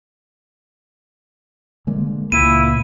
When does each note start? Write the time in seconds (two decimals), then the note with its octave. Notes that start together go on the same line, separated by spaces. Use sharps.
1.87 D3 G#3 A#3
2.32 C#2 A#2 E4 D#7